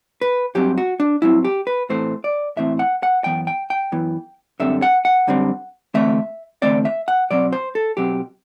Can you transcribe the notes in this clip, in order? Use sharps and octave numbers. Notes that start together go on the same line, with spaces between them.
B4
G2 F#3 C4 G4
F#4
D4
G2 F#3 C4 E4
G4
B4
A2 E3 A3 C4 C5
D5
A2 E3 A3 C4 E5
F#5
F#5
F#2 E3 B3 G5
G5
G5
F#2 E3 B3
F#2 D3 G3 C4 E5
F#5
F#5
F#2 D3 G3 C4
E2 D3 A3 C4 E5
E2 D3 A3 C4 D5
E5
F#5
B2 F#3 C4 D5
C5
A4
B2 F#3 C4 G4